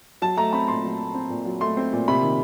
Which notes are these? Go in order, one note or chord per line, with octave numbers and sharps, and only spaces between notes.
F#3 A5
A3 A#5
C4 B5
A#2 C6
F#3
A3
C4
A#2
F#3
A3 C6
C4
A#2
C3 B5
D#3